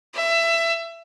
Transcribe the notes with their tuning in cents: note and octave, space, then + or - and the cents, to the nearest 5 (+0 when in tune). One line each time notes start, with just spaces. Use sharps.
E5 +20